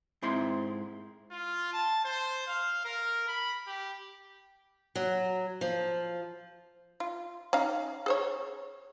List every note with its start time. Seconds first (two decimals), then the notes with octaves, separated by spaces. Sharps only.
0.22 G#2 C4 E4 C6
1.32 F4
1.73 A5
2.04 C5
2.47 F5
2.85 A#4
3.28 B5
3.67 G4
4.96 F#3
5.61 F3
7.00 F4
7.53 C#4 D#4 F5
8.06 G#4 C5 C#5